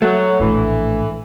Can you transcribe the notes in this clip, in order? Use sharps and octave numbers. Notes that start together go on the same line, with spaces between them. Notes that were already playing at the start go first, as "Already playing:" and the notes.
F#3 A3
A#1 A2 E3